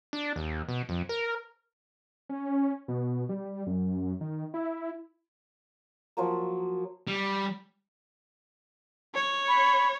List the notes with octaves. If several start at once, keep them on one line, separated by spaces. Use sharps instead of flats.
D4
D#2
B2
F2
A#4
C#4
B2
G3
F#2
D#3
E4
F3 F#3 A#3
G3
C#5
B5